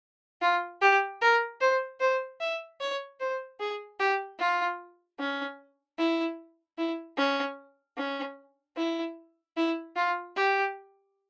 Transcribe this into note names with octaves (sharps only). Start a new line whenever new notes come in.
F4
G4
A#4
C5
C5
E5
C#5
C5
G#4
G4
F4
C#4
E4
E4
C#4
C#4
E4
E4
F4
G4